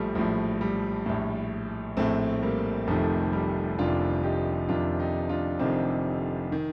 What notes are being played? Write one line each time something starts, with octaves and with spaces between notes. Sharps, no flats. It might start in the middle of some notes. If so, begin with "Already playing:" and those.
Already playing: A#1 A2 F3 G3 A3
A#1 A2 F3
G3
A#1 A2
A#1 A2 A3 C4
G3 A#3
F1 F2 C3 D#3 F3 A3
G3
F1 F2 C3 D#3 D4 F4
D#4 G4
F1 F2 C3 D#3 D4 F4
D#4 G4
D4 F4
F1 F2 C3 D#3 C4 D#4
D#3